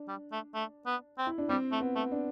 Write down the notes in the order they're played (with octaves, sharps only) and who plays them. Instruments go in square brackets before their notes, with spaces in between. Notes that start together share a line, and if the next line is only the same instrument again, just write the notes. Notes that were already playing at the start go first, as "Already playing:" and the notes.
Already playing: [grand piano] D4
[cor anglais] G3
A3
A3
B3
C4
[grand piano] E4
D4
[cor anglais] G3 [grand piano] C4
[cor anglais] A3
[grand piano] B3
[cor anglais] A3
[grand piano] D4